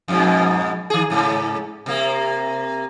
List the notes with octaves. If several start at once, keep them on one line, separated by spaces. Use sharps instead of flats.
F2 G#2 B2
D#3 G#4
G#2 C#3
C3 A#3